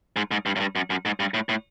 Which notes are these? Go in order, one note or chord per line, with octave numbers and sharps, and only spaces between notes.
G#2
G#2
G2
F#2
G2
F#2
F#2
G#2
G2
A2
A2